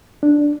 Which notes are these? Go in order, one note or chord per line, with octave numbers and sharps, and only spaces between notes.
D4